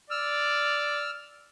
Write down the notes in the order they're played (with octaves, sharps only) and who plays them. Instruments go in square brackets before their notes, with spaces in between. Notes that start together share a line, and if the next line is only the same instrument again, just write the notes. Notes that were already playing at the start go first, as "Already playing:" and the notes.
[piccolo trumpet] D5 [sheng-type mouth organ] E6 F6